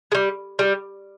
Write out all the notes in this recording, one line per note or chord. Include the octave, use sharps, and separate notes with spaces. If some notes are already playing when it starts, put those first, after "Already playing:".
G#3
G3
G3